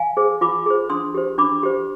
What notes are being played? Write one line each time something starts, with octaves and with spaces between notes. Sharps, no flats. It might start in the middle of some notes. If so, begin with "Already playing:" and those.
Already playing: F5 G#5
G#4 C5
F4 B5 D6
G#4 C5
D4 C6 D#6
G4 C5
D4 B5 D6
G4 C5